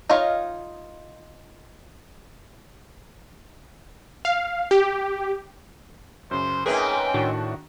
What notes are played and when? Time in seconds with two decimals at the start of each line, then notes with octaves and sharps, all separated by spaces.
0.09 D#4 F4 C#5 D#5 F5
4.25 F5
4.71 G4
6.31 F#2 C#3 C5
6.66 G#2 C4 C#4 G#4 A#4 B4 E5 G5
7.14 A2 D#3 D4 F#4